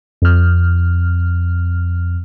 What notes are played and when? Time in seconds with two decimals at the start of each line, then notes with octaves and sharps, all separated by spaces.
0.22 F2 F6